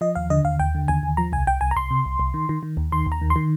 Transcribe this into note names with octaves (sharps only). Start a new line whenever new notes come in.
F3 D#5
D#2 F5
D3 D#5
D#2 F5
D#2 G5
D3
D#2 G#5
D#2
F3 A#5
C2 G#5
C2 G5
C2 G#5
A#5
C2 C6
C3
C2
C2
D#3
D#3
D#3
D#2
D#3 C6
D#2
A#5
D#3
C6
D#3